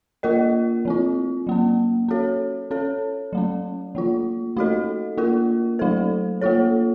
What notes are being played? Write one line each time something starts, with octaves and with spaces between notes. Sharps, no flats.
A#3 F4 A#4 D#5
F3 C4 F4
F#3 A#3 C#4
C#4 F#4 A4 C#5
C#4 A4 C#5
F#3 A3 C#4
F3 A#3 F4
A3 D#4 F#4 A4 D#5
A#3 F4 A#4
F#3 A3 D#4 A4 C5
A#3 F4 A4 C#5